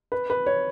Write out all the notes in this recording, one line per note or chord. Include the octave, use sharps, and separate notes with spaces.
B4
B4
C#5